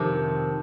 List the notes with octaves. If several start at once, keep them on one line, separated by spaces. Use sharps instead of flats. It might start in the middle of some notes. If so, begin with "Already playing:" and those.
Already playing: F2 C3 D#3